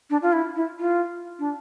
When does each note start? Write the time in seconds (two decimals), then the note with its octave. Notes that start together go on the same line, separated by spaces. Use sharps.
0.10 D4
0.22 F4
0.33 E4
0.56 E4
0.80 F4
1.39 D4